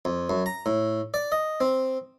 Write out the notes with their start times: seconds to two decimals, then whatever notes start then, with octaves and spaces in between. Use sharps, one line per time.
0.05 F2
0.30 F#2
0.46 A#5
0.66 A2
1.14 D5
1.32 D#5
1.61 C4